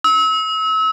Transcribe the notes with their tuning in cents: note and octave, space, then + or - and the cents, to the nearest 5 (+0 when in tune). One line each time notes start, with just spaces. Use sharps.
E6 -35